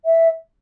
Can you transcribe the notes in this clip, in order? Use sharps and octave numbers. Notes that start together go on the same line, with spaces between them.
E5